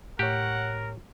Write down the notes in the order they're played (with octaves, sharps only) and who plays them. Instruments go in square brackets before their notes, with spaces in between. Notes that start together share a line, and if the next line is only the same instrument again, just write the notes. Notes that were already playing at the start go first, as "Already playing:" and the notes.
[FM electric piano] A2 C#5 [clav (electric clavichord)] G4 [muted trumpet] A#4 [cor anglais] F#5